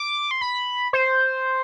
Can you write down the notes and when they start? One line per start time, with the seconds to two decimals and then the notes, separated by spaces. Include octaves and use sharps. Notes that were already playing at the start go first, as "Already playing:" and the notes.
Already playing: D6
0.31 C6
0.41 B5
0.93 C5